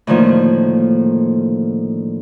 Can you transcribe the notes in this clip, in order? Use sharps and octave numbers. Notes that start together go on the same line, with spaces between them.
A2 D3 D#3 F3 A#3